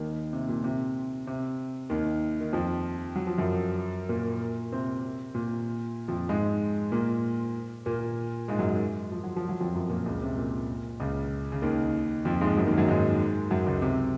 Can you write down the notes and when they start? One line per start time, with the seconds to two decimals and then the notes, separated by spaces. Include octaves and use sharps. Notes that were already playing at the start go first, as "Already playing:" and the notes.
Already playing: D#2 D#3
0.33 C3
0.48 A#2
0.64 C3
1.27 C3
1.90 D#2 D#3
2.41 D#3
2.53 F2 F3
3.16 F#3
3.27 F3
3.38 F#2 F#3
4.09 A#2 A#3
4.72 C3 C4
5.34 A#2 A#3
6.08 F2 F3
6.29 G#2 G#3
6.92 A#2 A#3
7.86 A#2 A#3
8.48 G#2 G#3
8.59 F#2 F#3
9.12 F3
9.23 F#3
9.36 F3
9.49 F#3
9.60 F2 F3
9.74 F#2 F#3
9.89 A#2 A#3
10.06 C#2 C#3
10.22 C3
10.38 A#2
11.00 C#2 C#3
11.52 C#3
11.62 D#2 D#3
12.25 F2 F3
12.41 G#2 G#3
12.57 F#2 F#3
12.67 D#2 D#3
12.78 F#2 F#3
12.88 G#2 G#3
13.51 F#2 F#3
13.66 C#2 C#3
13.82 C3